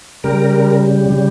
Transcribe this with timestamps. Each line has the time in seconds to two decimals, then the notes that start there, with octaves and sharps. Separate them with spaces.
0.24 C#3 G3 A#4
1.09 C#3 G3